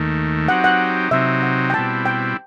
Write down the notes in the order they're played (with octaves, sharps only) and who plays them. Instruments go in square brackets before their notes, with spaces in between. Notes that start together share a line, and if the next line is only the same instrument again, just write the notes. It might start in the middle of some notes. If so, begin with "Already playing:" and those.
Already playing: [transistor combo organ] D#2 D#3 A3
[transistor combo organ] F#3 C4 D#4 G4 [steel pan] F#5
[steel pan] F#5
[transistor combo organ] C3 F#3 C4 D#4 [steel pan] E5
[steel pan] F#5
G5
[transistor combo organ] B2 G3 C4 E4 [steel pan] A5
[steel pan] G5